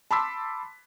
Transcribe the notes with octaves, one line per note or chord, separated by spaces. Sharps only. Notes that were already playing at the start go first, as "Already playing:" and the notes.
A5 B5 C6 D6 E6 B6